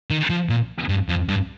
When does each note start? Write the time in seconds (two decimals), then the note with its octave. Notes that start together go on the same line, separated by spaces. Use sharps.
0.10 D#3
0.30 F3
0.49 A#2
0.89 G2
1.09 F2
1.28 G2